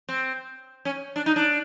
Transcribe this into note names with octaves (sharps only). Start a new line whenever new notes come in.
C4
C#4
D4
D#4
D4